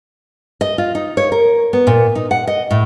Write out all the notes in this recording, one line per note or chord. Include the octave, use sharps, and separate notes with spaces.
D#5
F4
D#4
C#5
A#4
B3
A#2
D#4
F#5
D#5
A2